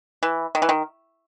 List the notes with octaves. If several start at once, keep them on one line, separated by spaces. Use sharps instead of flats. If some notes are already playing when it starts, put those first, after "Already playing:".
E3
D#3
E3
D#3